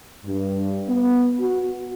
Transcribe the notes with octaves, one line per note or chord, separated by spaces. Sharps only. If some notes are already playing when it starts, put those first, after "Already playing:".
G2
B3
F#4